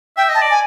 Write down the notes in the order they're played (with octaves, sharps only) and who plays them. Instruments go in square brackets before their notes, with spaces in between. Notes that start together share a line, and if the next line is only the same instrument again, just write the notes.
[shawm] E5 [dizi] G5
[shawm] D#5
[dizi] A5
[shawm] D5
[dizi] G#5